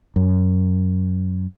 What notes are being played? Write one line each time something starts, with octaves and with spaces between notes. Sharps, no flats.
F#2